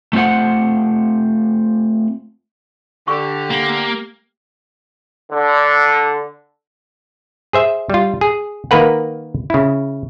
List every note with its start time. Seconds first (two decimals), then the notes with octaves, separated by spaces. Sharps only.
0.13 A3 C4 F4 C5 F#5
3.08 D3 G4 C#6
3.50 A#3
5.32 D3
7.53 G#4 C5 E5
7.90 G3 F4
8.21 G#4
8.71 D#3 A#3 A#4 B4 F#5
9.50 C#3 E4